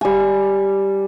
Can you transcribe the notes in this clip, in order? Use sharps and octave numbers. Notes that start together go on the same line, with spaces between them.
G3 G#5